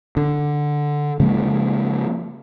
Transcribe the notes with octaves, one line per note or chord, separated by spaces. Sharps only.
D3
C#3 F3 G#3 A#3